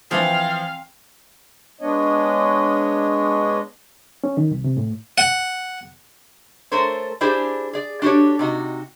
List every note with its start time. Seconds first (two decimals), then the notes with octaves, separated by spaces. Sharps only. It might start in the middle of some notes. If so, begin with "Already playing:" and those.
0.11 E3 F3 C4 F5
1.81 G#3 B3 D4 C#5 D#5
4.24 C#4
4.37 D#3
4.51 C2
4.64 C3
4.77 A2
5.18 F#5
6.71 A3 A4 A#4 C5 C#5
7.21 D4 E4 G4 G#4 C5 D5
7.73 G#4 D5
8.02 D4 F#4 G4 A4 C#5
8.39 C3 D#4 F#4